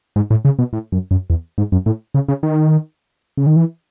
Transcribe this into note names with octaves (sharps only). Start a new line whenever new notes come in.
G#2
A2
C#3
B2
A2
F#2
F#2
E2
G#2
F#2
A2
C#3
C#3
D#3
C#3
D#3
E3